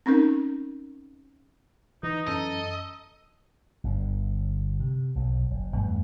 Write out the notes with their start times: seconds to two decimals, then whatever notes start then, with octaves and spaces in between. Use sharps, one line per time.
0.06 C4 C#4 D#4 A#4
2.03 E3 D#4
2.27 F#2 C#4 A4 D#5 A#5
3.84 G1 D3
4.80 C3
5.15 B1 F#3
5.51 F#1
5.76 E2 G2 A3